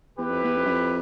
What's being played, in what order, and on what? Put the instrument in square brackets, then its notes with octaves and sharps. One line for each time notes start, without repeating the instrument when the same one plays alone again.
[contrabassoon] E2 [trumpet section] E4 G4 B4
[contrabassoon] F2
E2
F2
F#2
F2